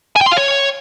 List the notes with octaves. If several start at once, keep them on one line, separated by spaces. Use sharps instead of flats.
G#5
G5
C6
F5
C#5